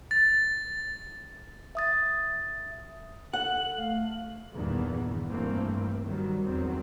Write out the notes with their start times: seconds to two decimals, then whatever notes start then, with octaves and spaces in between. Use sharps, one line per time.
0.11 A6
1.75 E5 D#6 A6
3.33 A4 F#5 F#7
3.77 A3 F5
4.53 E2 G2 A#2 D#3 E3 B3
5.30 G2 E3 A3 A#3 C4
6.04 D#3 F#3 G3
6.44 E2 D#3 F#3 C4